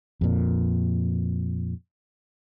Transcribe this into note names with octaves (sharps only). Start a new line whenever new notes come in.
F2 A#2